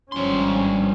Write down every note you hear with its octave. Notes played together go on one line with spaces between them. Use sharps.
G#1 G2 F3 C#4 C6